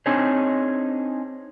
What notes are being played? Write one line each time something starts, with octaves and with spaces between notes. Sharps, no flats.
C4 D4 D#4 G#4 C5 C#5